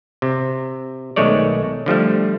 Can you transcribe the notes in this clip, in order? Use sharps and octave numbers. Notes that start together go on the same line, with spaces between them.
C3
B1 D#3 G#3 A3 C#5 D5
D3 F3 G3 A3